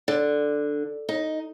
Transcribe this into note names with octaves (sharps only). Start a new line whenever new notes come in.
D3
D#4